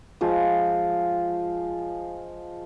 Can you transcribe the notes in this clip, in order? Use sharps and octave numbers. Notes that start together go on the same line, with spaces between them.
F3 G#3 F4